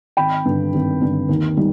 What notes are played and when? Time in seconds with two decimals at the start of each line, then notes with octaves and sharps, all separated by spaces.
0.17 G#1 G5 B5
0.45 G2 D3
0.73 G#1
1.01 G2 D3
1.29 D#2
1.57 D#3 G3